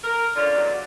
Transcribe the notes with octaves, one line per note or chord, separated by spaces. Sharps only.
A#4
D3 C#4 F4 D5
E2 B2 F#3